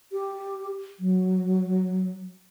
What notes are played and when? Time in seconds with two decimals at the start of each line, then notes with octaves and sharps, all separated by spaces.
0.12 G4
1.00 F#3